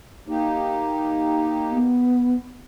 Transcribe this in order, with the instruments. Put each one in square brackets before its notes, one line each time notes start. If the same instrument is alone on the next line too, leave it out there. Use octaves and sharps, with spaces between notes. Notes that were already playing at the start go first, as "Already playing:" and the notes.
[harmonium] A#3 D#4 G4
[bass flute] B3